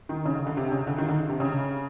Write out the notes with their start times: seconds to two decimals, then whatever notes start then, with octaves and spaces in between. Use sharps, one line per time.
0.09 D#3
0.26 C#3
0.35 D3
0.47 D3
0.57 C3
0.72 C#3
0.87 D3
0.98 D#3
1.09 D3
1.29 C3
1.40 C#3